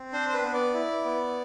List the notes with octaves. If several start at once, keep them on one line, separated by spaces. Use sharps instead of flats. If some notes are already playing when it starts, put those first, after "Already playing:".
Already playing: C4
D4 C5
C5
B4
B3
D5
E4
B3